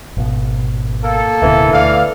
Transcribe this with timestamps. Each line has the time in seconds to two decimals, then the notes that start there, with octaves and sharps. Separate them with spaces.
0.17 G#1 B2
1.04 A#3 A4
1.42 D1 B2 D3 E3
1.72 D2 A4 D5 F5